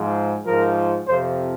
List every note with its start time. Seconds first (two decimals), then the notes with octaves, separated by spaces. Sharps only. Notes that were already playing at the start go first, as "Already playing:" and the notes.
Already playing: G#2 F3
0.45 G#2 F3 A#4
1.07 F2 C3 F3 C5